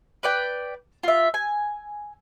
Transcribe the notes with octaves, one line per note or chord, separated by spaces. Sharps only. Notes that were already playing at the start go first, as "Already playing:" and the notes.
B4 D5 G5
F4 E5
G#5